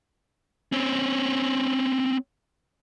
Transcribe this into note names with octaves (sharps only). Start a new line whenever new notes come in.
C4 C#4